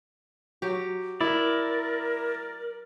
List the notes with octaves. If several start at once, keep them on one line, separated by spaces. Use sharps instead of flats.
F#3 G4
E4 A#4 D5